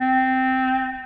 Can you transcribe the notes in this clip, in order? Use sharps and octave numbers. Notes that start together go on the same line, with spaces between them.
C4